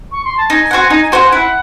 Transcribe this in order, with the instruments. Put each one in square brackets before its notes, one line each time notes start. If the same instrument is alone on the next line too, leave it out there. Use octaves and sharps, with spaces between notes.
[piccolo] C#6
C6
A5
[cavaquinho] D#4 [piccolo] G#5
[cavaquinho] F#4 C5 F#5
D#4
F#4 C5 F#5
[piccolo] G#5
[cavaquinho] E4 [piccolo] F#5